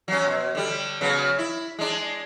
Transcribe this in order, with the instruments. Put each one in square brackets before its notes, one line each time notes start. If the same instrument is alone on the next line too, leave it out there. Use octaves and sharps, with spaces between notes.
[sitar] F#3 C#4
B2
D3 G3
C#3 F#3 B3
E4
G#3 D4